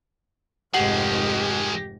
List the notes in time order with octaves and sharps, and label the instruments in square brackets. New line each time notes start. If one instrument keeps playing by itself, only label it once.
[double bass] F1 G#2 [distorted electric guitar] D#3 G#3 [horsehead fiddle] G4 [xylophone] F#5 C7 F#7